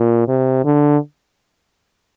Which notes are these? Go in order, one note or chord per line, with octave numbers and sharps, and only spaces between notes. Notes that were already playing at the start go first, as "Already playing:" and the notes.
Already playing: A#2
C3
D3